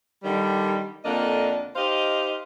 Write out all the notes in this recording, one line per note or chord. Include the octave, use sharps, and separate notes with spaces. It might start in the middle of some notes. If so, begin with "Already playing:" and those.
D3 D#3 G3
F2 D3 A#3 D4 D#5
D#4 G4 C5 D#5 F5